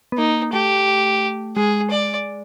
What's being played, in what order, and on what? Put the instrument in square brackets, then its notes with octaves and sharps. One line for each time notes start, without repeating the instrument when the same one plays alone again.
[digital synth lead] B3
[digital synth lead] A#3 [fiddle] D#4
[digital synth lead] A3 [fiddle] G4
[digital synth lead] G#3 [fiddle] G#4
[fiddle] D5